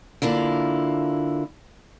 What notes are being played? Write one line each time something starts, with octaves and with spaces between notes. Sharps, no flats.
D3 A#3 E4 F4